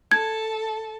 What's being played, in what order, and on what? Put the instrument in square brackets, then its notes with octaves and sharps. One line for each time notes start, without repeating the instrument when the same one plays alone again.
[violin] A4 A5 [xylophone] G#6